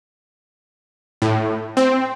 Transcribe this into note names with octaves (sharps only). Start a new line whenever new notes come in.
A2
C4